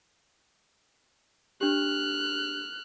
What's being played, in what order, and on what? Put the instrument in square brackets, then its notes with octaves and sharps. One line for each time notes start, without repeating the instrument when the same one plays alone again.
[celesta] D4 G4 [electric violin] F6 F#6